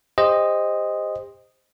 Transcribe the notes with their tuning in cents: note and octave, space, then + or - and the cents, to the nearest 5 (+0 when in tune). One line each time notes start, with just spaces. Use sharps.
G4 +35 C5 +0 D#5 +0